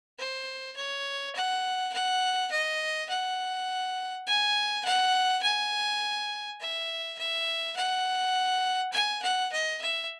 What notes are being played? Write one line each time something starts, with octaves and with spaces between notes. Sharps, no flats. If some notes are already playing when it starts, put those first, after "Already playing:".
C5
C#5
F#5
F#5
D#5
F#5
G#5
F#5
G#5
E5
E5
F#5
G#5
F#5
D#5
E5